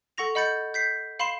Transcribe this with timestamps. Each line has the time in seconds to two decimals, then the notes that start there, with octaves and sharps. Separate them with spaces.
0.18 A4 F#5 C#6 A#6 F7
0.35 D#5 F#5 B5 G6 A6 C#7
0.74 G6 B6 C7
1.19 F5 B5 C6 C7 E7